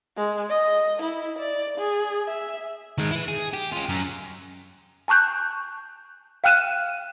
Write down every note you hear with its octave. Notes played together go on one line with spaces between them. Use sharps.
G#3
D#5
E4
D5
G#4
E5
D#3 G#3
E4 B4
G#4
G4
C#4 F4
F#2
G#5 A5 C#6 F#6 G6
F5 G5 F6 F#6 D#7 E7